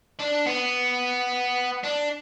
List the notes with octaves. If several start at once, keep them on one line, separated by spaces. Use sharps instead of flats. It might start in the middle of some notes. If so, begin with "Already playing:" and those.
D4
B3
D4